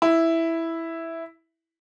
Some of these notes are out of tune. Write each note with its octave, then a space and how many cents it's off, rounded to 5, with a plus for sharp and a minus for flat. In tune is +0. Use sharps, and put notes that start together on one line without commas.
E4 +0